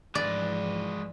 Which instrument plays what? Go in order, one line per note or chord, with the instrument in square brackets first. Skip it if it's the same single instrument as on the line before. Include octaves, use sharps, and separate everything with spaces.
[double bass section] G#2 E3 F3 [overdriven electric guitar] G#3 B4 [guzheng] D5